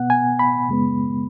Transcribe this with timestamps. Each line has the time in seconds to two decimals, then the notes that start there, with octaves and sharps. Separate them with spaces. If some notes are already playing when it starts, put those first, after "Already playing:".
Already playing: B2 B3 F#5
0.10 G#5
0.39 B5
0.69 F#2 C#3 G#3 B3